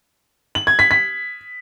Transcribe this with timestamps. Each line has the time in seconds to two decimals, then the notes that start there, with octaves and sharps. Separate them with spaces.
0.55 F#7
0.67 G#6
0.79 B6
0.91 B6